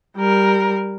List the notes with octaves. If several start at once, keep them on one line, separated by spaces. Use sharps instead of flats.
G3 A#4